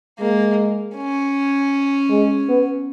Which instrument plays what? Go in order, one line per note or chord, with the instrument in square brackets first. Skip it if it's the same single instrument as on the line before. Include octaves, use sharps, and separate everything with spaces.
[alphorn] G#3 [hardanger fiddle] A#3
[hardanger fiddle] C#4
[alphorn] G#3
B3